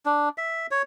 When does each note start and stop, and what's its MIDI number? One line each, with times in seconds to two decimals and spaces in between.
0.06 0.29 62
0.38 0.67 76
0.71 0.82 73